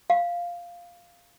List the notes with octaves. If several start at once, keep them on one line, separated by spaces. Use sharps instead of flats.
F5